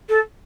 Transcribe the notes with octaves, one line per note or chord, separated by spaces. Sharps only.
A4